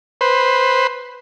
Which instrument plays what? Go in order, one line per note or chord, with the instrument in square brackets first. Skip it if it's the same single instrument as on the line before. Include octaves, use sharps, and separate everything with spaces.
[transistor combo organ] B4 C5